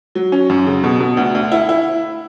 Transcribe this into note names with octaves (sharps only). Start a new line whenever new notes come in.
F#3
C#4
F#2
C#3
B2
B2
D2
D2
E4
E4